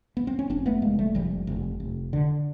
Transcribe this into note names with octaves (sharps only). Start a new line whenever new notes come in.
B3
C4
C#4
F1 C4 D4
A3 B3
F1 G#3 A#3
G3 A3
F1 F3 G3
F1
F1
D3